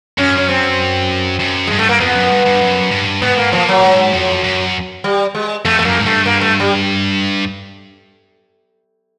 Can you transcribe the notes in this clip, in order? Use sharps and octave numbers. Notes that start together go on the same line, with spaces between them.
F#2 C#4
C#4
C4
F#2
G2 G#3
A3
A#3
F2 B3
F#2
G2
G2
F#2
G2
G#2 B3
A#3
A#2 F3
F#3
G#2
F2
F#2
G3
G#3
F2 A3
A3
F#2 A#3
G#2
G2 A3
A#3
A3
G3